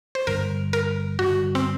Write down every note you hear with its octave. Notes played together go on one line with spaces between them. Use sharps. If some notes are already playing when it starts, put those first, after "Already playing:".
C5
G2 D3 G3 A#4
A#4
G2 D3 G3 F#4
C4